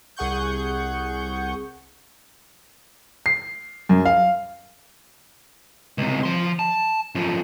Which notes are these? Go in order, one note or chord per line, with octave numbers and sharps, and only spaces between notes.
C2 G#4 F#5 C#6 G6
C7
F#2
F5
C#2 C3
F3 C6
A5
F#2 F3